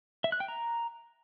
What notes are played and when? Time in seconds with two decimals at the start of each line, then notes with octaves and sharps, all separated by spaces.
0.24 E5
0.32 F#6
0.40 G5
0.48 A#5